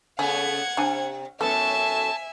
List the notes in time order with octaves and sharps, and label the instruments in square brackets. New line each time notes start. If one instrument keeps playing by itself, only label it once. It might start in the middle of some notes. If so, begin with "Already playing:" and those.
[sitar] C#3 A3 B3 [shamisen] G#4 [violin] F#5 G#6
[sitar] C3 [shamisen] D4 G#5
[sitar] F#2 A2 A4 [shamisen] B3 [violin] E5 G#5 [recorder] A5